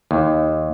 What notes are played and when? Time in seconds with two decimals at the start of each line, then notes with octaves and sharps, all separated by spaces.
0.11 D#2